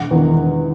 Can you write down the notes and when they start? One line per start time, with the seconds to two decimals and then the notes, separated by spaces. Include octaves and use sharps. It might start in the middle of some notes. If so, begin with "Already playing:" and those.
Already playing: E1 F#5
0.11 E2 D#3